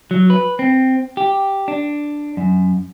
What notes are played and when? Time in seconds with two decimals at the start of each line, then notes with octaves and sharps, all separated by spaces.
0.11 F#3
0.30 B4
0.59 C4
1.17 G4
1.68 D4
2.37 F#2